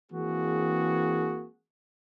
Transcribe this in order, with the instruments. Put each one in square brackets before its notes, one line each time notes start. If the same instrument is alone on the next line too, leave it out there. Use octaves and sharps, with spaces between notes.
[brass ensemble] E3 G#3 A#3 C4 F#4 G#4